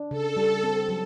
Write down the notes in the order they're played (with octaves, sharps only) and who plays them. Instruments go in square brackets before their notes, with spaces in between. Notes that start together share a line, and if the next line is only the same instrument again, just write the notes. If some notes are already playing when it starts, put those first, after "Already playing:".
Already playing: [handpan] D4
[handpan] C#3 [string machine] A4
[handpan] G3
C4
F#3